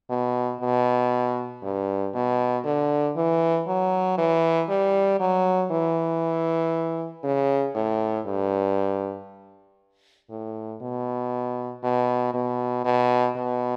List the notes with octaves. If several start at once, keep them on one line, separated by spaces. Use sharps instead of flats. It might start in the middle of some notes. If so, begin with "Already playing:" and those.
B2
B2
G2
B2
D3
E3
F#3
E3
G3
F#3
E3
C#3
A2
G2
A2
B2
B2
B2
B2
B2